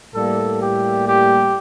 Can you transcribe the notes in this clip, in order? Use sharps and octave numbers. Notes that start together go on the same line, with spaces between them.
A2 G3 A#3 A4
G4
G4